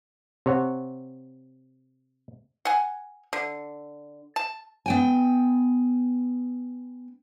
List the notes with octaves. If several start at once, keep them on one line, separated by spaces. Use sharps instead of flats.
C3 C#5 F#5
F#5 G#5
D3
A5
B3 G5 G#5